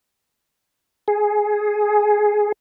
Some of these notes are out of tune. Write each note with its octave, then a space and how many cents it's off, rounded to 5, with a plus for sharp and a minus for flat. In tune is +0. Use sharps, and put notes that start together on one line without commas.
G#4 +10